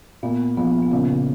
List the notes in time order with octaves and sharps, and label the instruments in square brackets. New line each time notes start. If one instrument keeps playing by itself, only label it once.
[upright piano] A#2 [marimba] B3
[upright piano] A#1 [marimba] B3
[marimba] B3
[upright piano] A#2 [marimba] C#3 C#4